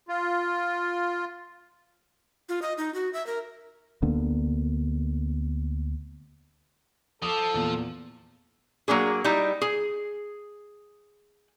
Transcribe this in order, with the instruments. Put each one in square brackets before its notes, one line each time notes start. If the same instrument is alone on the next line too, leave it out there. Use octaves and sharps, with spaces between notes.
[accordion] F4
[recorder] F4
D#5
D#4
F#4
E5
A#4
[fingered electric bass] D2 D3 A#3 B3
[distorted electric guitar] F3 [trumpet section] A4 [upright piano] D6 D#6
[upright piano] E2 A#2 F#7
[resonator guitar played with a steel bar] F#3 A#3 D4 G#4
G3 D#4 E4
G#4